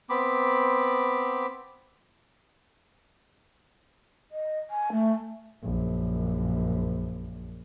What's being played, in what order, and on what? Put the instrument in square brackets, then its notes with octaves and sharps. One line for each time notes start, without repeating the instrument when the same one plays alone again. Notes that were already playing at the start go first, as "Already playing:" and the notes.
[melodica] B3 C4 B5 D6
[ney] D#5
G#5
A3
[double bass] A#1 F#2